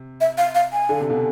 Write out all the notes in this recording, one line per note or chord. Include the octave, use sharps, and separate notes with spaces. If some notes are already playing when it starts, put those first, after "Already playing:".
Already playing: C3
E5
F5
F5
G#5
D3
C3
B2 D3